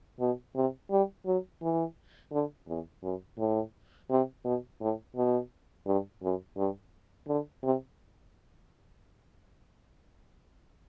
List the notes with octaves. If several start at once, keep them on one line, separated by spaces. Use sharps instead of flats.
B2
C3
G3
F#3
E3
D3
E2
F#2
A2
C3
B2
A2
B2
G2
F#2
G2
D3
C3